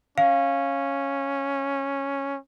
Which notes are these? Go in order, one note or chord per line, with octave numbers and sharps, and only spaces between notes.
C#4 F5